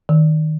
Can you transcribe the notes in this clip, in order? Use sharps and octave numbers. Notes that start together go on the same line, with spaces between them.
D#3